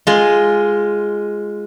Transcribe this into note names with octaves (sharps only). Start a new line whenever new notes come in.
G#3 F4